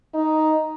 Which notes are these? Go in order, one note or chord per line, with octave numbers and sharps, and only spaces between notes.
D#4